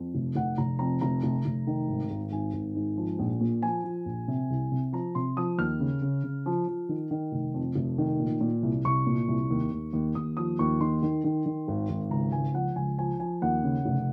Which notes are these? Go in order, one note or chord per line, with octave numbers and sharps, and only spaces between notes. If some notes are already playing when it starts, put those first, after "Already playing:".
Already playing: F2
F1
F1 F#5
F1 A#5
F2 A#5
F1 A#5
F1
F1
D#3
G#1
G#1
G#1 G#5
G#1
G#2
F3
A#1
A#2
F3 G#5
F3
A#1
C3
C2
C3
F3 A#5
C3 C6
F3 D#6
D#2 F6
C#3
C#3
C#3
F3
F3
D#3
D#3
F1
F2
F1
D#3
A#2
A#2
C2
C2 C#6
A#2
C2
D#2
D#2
D#2
D#2 D#6
F3 D#6
D#2 C#6
D#3 C6
D#3
D#3
D#3
G#1
G#1
C#2 A#5
C#2 G#5
F3 F#5
C#2 G#5
F3 G#5
F3 G#5
D#2 F#5
C#3
F1